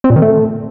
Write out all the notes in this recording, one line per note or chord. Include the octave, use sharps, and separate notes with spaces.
C4
A#2
D#3
A3